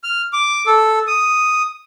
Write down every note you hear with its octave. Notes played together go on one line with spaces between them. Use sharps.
F6
D6
A4
D#6